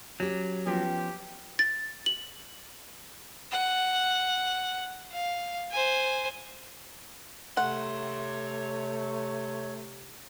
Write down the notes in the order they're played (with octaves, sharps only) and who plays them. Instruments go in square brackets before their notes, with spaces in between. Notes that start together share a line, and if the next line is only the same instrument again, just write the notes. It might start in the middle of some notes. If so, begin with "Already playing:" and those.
[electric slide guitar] F#3 [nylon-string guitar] C#4 G4
[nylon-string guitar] F3 B3 C#4 [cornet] G4
[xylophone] A6
F#7
[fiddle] F#5
F5
C5 G#5
[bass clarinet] C3 [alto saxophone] A3 [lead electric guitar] C#5 C6 [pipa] F#5